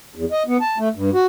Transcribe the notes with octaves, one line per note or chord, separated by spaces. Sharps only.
E2
D#5
B3
A5
A3
G2
F#4